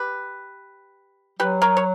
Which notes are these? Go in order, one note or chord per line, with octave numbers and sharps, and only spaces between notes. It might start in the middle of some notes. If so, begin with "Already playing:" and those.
Already playing: G4 B4
F#3 G4 B4
A#4 C#5
C#5